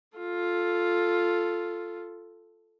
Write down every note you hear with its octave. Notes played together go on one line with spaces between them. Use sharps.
F4 A4